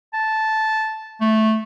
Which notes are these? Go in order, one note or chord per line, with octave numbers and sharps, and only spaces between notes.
A5
A3